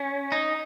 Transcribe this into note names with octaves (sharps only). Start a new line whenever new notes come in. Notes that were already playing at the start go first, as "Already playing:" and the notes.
Already playing: C#4
D#4